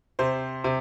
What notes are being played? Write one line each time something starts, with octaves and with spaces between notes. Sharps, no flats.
C3 C5
C3